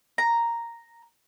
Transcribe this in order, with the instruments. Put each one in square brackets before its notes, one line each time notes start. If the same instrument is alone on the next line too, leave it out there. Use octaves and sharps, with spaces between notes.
[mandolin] A#5